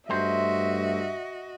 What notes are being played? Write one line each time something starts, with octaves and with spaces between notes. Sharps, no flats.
G2 A3 F#4 C5 D#5 E5